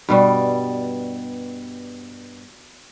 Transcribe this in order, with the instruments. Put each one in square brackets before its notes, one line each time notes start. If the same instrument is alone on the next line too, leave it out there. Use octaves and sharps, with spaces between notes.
[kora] G2 B2 G3